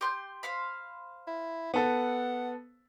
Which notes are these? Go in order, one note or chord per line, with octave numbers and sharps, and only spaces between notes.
G4 C6 G6
C5 F5 B5
E4
B3 A4 F#5